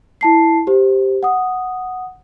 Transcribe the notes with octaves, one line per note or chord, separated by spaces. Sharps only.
E4 A5 C7
G4 C5
F#5 D#6